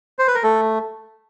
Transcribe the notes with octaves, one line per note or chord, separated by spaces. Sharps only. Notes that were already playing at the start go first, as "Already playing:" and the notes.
C5
B4
A#4
A3 A4